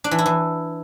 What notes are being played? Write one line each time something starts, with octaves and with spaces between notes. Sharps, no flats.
D4
E3
E4
E3